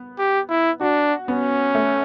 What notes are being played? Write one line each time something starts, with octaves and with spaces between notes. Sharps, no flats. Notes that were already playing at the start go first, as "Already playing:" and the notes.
Already playing: B3
G4
E4
D4 F#4
B3 C#4
A3